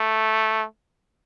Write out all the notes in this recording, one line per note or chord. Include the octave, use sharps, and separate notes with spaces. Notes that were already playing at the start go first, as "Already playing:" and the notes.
Already playing: A3